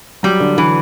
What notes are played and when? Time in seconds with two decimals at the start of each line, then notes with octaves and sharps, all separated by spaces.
0.23 F#3 G3
0.40 D3
0.57 D3 E3